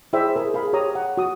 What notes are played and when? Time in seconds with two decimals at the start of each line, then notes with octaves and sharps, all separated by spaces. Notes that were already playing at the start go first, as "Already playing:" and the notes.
0.13 E4 G#4 C5 D5 E5 G5
0.36 G#4 A#4
0.54 G#4 F5 B5
0.73 G4 C#5 A#5 D#6
0.95 F#5
1.17 F#4 D#6